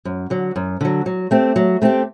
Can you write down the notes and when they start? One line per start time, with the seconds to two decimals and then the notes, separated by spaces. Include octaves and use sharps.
0.05 F#2
0.30 D3 F#3
0.56 F#2
0.81 D3 F#3
1.06 F#3
1.31 A3 C4 G4
1.56 F#3
1.82 A3 C4 G4